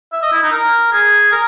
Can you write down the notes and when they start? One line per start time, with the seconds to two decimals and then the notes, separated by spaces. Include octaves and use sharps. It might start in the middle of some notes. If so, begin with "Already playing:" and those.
0.13 E5
0.23 D#5
0.32 E4
0.43 D#4
0.52 A#4
0.92 G#4
1.32 A#4